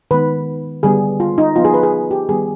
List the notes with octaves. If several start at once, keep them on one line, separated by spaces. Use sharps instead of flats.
D#3 G#3 B3 B4
D3 G3 B3 G#4
F4
D#4
F3 B3 F4
G#4
B4
G#4
G4
D#3 G3 B3 G#4